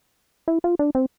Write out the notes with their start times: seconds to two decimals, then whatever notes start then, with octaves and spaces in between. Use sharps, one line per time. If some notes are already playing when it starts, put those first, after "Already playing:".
0.48 E4
0.64 F4
0.79 D4
0.95 C4